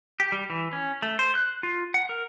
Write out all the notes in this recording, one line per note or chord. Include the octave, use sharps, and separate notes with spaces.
G4
G3
E3
C#4
A3
C5
F#6
F4
F#5
A#4